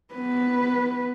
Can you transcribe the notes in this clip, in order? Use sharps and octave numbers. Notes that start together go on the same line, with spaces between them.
B3 B4